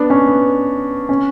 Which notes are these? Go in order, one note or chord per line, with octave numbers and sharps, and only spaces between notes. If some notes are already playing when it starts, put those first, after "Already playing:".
Already playing: B3 D4
C#4
B3
C#4